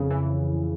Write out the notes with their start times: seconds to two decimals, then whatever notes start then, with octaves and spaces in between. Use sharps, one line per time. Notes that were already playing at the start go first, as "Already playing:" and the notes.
Already playing: F2 C#3
0.10 E3